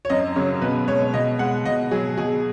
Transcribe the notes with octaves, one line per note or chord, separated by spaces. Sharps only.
C#5
F#2 D#5
C#3 F#3 C#5
B2 B4
G#3 C#5
B2 D#5
G#3 F#5
B2 D#5
F#3 G#4
B2 G#4